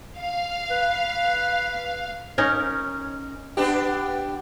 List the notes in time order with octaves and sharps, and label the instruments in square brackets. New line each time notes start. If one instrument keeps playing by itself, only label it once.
[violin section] F5
[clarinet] B4
[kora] C#4 D#4 A#4
[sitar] B3 D4 G4